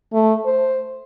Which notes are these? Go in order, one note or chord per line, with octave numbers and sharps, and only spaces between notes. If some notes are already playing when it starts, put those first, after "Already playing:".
A3
C5